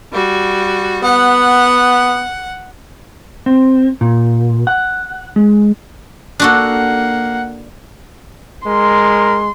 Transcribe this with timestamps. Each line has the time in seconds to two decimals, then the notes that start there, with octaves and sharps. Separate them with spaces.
0.13 G3 F#4
1.04 B3 F#5
3.46 C4
4.01 A#2
4.67 F#5
5.36 G#3
6.40 A#3 D4 F#4 A4 F#5
8.66 G#3 A#4 C6